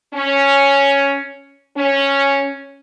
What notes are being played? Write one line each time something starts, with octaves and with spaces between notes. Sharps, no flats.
C#4
C#4